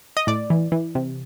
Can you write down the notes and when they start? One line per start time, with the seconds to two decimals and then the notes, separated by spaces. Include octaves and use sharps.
0.17 D#5
0.27 A2 D5
0.50 E3
0.72 E3
0.95 C3